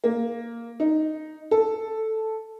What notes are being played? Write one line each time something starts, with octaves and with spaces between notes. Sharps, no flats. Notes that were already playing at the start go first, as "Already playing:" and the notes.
A#3
D#4
A4